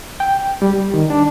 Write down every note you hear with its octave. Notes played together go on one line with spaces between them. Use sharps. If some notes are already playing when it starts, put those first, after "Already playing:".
G5
G3
D#3
D4